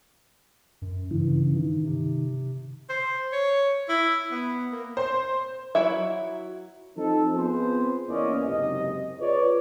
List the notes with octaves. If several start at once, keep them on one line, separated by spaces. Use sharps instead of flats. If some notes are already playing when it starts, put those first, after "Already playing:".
F#2
G2 C#3 E3
D#3
C3
C5
C#5
E4
B3
A#3
C5
F#3 E4 F#4 E5
F3 C4 D#4 A4
B3 C4 F4 G#4 B4 C5
E2 E3 A#3 C#4 D5 D#5
F#1 G#2 C3 D#5
F4 G#4 B4 C#5 D5